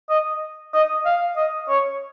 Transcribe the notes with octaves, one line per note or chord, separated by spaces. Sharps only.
D#5
D#5
F5
D#5
C#5